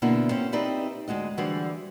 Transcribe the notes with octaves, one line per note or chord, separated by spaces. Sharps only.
B2 D3 A#3 B3 E4 F#4
C4 C#4
C4 D#4 G4 B4 D5 E5
D2 G#3 F#4 D#5
D3 E3 G3 F#4 G#4 C5